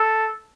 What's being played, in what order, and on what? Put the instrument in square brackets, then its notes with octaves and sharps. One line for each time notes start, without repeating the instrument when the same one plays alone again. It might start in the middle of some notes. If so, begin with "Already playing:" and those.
Already playing: [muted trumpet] A4